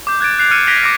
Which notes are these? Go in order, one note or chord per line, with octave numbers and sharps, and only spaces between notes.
D6 G6
F#6 G#6 A6 D7
F#6 C7 F7
F6 C#7 D#7
G#6 A#6 B6 D7 F7 G7
D6 F6 A#6 D7